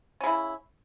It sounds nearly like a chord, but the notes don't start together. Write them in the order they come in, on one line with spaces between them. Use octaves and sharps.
C#4 C#3 E4